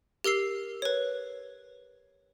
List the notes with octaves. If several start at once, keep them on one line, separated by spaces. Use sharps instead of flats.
G4 A#4 E6 C7
B4 C#5